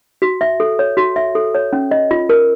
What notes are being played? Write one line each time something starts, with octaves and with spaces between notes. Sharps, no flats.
F#4
E5
A4
C#5
F#4
E5
A4
C#5
C#4
D#5
F4
A#4